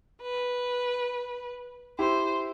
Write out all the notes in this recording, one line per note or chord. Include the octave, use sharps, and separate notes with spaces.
B4
E4 G4 C5